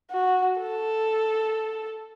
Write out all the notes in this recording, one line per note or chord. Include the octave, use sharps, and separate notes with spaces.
F#4
A4